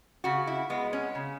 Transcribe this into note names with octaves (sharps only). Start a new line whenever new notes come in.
C#3 F#4
E4
G#3 B3
C#4
C#3